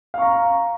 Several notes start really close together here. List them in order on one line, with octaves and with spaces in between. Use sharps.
F5 C#6 A#5